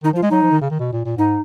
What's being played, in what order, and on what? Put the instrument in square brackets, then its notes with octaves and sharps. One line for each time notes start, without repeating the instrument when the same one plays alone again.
[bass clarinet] D#3 [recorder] D#4
[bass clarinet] F3 [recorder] F4
[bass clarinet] G#3
[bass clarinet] F#3 [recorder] D#4
[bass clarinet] F3
D#3
C#3
D#3
B2
A#2
A#2
[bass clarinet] G#2 [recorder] D#4